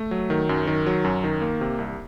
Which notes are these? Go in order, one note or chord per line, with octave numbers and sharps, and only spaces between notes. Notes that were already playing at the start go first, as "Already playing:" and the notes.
Already playing: A3
F#3
D#3
F#2
D#3
F#3
F#2
D#3
A#3
C3
C2